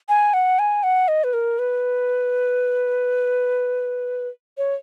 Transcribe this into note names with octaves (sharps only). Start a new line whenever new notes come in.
G#5
F#5
G#5
F#5
D#5
B4
A#4
B4
C#5